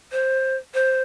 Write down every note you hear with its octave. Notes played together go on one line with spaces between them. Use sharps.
C5
C5